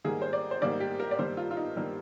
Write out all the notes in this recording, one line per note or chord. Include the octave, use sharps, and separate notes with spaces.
G#2 D#3 G3 A#3 G#4
C5
D5
C5
G#2 D#3 G3 A#3 D5
G4
A#4
D5
G2 D#3 G3 A#3 C5
F4
F4
D#4
G2 D#3 G3 A#3